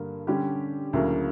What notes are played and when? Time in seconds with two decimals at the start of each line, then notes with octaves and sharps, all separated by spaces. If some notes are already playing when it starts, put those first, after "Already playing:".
Already playing: G2 D3 A#3
0.27 D3 G3 C#4 G4
0.93 D2 C#3 F#3 A#3 E4